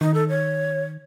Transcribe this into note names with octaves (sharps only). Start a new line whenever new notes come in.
D#3 D#4
A4
C#5